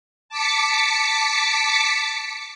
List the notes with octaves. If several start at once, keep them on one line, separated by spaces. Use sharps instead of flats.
A5 D6 B6 C#7